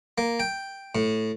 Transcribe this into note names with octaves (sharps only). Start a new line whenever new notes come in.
A#3
G5
A2